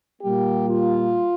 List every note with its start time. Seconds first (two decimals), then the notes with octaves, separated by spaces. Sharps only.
0.22 A#2 G3 A#3 G4
0.70 F4